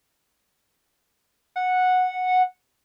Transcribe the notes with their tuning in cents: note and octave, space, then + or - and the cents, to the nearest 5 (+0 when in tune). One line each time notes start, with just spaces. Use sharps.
F#5 -10